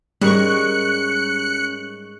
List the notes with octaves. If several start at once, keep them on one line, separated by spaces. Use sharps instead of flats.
G#2 G3 C#4 A#4 C#6 F#6 C#7